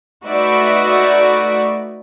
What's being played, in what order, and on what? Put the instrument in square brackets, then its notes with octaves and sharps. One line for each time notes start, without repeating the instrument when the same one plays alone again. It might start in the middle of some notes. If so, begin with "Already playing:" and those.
[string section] A3 D#4 F#4 B4 D5 E5